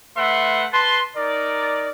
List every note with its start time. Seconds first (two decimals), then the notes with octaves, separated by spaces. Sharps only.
0.17 A3 B4 E5 F#5 C6
0.72 B4 A5 C6
1.16 D#4 A#4 D5